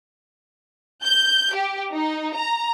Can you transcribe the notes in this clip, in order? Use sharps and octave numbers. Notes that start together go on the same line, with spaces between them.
G6
G4
D#4
A#5